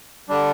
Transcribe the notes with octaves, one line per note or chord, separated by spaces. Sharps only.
D3 G3 D4